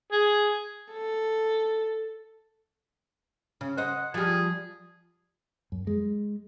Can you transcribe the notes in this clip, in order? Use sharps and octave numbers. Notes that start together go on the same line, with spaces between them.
G#4
A4
C#3
C5 D#5 F#5
F3 G3 G#4
F#2
G#3